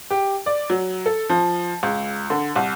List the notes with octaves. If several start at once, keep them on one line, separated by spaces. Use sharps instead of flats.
G4
D5
F#3
A4
F3
C#2
D3
C2